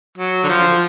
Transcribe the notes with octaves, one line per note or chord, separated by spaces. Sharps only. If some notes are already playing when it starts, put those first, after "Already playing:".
F#3
D3
F3